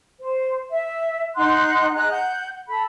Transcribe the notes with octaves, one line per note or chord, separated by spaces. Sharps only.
C5
E5
D#4 F#5 C6 F#6
G#4 D#5 A#5 F#6
F#5 G6
A4 B5